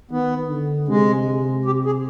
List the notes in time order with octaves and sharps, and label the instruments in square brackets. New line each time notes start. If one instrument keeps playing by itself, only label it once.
[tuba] D#3 [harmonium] B3
[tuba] D3
[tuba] C3 [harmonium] G#3
[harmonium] G4
G#4